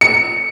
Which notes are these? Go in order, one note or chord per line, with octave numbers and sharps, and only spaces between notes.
C#7